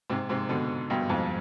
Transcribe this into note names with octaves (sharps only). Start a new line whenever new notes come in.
G#2 C3
G#2 C3
B2 D3
G2 B2
F2 G#2